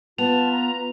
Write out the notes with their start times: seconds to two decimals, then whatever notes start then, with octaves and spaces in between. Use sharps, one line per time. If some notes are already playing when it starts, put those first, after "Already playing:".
0.18 B3 F4 A5 F7
0.51 A#5